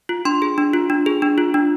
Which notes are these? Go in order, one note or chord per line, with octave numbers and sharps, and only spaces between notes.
F4
D4 C6
G#4
D4
F4
D4
G#4
D4
F4
D4